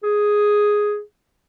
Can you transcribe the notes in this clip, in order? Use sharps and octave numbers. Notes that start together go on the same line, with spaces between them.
G#4